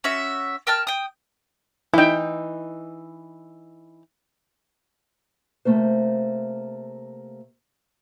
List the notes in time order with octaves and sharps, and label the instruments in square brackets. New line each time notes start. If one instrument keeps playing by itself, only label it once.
[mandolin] C#4 F#4 E5
A#4 G5 A5 F6
G5 D#6
[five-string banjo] E3 D#4 [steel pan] E4 E5 G5
[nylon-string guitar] C3 A3 A#3 C5